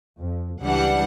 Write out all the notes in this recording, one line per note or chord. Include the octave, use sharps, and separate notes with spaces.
F2
C#2 E3 G3 D4 F#5